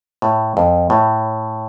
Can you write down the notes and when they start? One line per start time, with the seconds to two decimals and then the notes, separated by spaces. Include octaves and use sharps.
0.22 A2
0.57 F2
0.90 A2